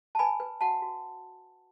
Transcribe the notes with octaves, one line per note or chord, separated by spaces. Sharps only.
A5
B4 G#5 B5
B4
F#4 F#5 A5
F#4